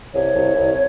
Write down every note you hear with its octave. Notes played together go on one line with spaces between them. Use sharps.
C2 C#5
C2
C2